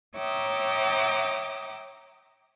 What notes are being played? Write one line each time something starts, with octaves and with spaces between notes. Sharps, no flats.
C#5 E5 G5 A#5 D6 D#6